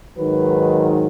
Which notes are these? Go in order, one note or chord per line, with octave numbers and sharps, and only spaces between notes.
G#2 D#3 F#3 B4